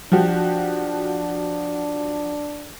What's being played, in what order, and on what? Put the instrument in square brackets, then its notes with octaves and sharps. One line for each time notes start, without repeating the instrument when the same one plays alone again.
[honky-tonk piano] F3 F#4 G4 [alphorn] D4